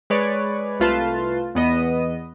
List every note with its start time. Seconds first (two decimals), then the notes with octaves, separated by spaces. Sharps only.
0.10 G#3 B4 C#5 D5
0.80 C2 A3 F4 B4 A5 C6
1.55 E2 B3 D#5 D#7